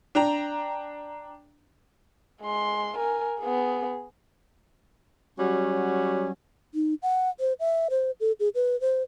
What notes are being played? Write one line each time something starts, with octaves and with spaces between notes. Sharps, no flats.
D4 G5 A#5
G#3 C6
A#4 G#5
B3 G#4
F#3 G3 C#4 F#4
D#4
F#5
C5
E5
C5
A4
G#4
B4
C5